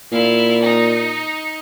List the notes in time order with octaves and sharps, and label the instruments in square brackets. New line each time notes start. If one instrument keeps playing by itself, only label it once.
[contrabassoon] A#2 [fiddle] E4 F5
[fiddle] D#4